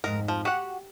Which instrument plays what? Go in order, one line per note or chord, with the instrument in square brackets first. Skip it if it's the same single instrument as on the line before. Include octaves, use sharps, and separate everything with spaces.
[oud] F2 G#2 D#4 [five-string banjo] A#4
[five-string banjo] F3
[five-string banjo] F#4 F#5 [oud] G4